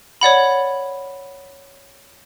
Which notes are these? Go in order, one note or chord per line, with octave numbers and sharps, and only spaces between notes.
C#5 D5 F#5 B5